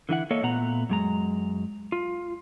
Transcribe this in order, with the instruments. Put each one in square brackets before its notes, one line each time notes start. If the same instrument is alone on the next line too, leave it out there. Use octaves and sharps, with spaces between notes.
[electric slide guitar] D3 E3 E4 F#5
A#3 A4 C#5 D#5 E5
A#2 A3 B3 F#5 A#5
F#2 G#3 A#5
F4